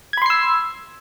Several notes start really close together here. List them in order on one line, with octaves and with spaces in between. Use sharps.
G#6 B5 C6 C7 E6